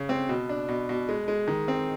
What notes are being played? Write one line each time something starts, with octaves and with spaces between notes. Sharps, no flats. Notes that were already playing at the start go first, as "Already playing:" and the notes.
Already playing: C#3
C4
B2
D4
B2
B2
G#3
G#3
D#3
C4